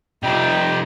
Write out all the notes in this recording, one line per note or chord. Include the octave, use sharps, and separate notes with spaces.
C3 F3 G3 D#4 G5